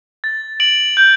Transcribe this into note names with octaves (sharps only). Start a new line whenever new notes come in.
A6
D7 F#7
G6